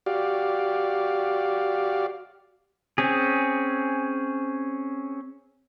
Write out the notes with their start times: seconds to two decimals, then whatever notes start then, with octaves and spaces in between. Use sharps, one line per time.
0.06 F#4 G4 D5 F5
2.98 C4 C#4 G#4